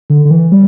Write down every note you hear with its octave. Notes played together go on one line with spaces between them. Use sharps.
D3
D3
E3
G3